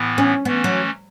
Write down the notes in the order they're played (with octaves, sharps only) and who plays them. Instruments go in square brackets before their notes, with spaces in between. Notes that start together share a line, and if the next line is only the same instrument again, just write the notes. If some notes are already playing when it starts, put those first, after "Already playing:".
Already playing: [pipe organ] A2 E3 B3
[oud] C#4
[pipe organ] E3 A3 C#4 [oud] B3
[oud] F#3